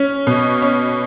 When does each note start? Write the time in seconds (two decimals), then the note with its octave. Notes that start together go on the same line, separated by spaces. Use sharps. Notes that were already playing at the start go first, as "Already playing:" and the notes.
Already playing: C#4
0.27 B2
0.62 C#4